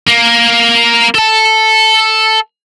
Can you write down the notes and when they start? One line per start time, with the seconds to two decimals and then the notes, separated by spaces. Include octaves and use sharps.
0.08 A#3
1.15 A4 A5